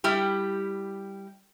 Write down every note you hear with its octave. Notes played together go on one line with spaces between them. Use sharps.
G3 E4 G4